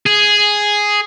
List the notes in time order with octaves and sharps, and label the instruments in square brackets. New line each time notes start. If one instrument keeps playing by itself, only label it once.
[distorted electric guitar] G#4